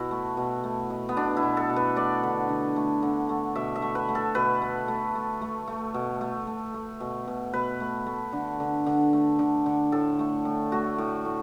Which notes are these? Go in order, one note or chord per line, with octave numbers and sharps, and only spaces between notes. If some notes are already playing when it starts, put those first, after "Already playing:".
Already playing: B2 E4 F#4
A3
B2
A3
B2
B3
B2 D4
E4
B2
A4
B2
B4
A3 D5
D3
D3
A3
D3
A3
B2 E5
E5
A3
B4
A3
A4
B2 B4
A3
A3
A3
A3
A3
B2
A3
A3
A3
B2
B2
B2 B4
A3
A3
D3
D3
D3
A3
D3
D3
A2 A4
A3
A2
A3 F#4
A2
A2